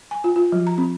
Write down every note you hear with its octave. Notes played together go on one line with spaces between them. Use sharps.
G#5
F4
F4
F3
A#5
C4